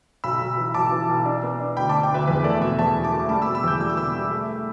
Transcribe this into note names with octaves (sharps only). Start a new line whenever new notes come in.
B1 B5 E6
B1
E3
B1 A5 D6
E3
B1
D4
B3
D4
D2 G5 B5
D4 A5 D6
G5
D2 B4 E5
E2 B4
A3 A4 D5
B2 B4 E5
E2 E5 A5
E1
A5 D6
A3
G3 A5 D6
B2 B5 E6
B5 E6
E2 D6 G6
G3 E6
D6
B2 B5 E6
G3
A3
A3